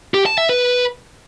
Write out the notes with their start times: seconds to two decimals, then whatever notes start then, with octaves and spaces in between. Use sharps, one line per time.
0.14 G4
0.26 A5
0.38 E5
0.49 B4